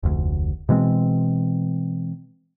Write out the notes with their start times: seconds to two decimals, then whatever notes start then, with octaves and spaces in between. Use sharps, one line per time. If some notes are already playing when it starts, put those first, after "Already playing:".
0.03 F1 D2
0.69 B2 E3 G#3 C4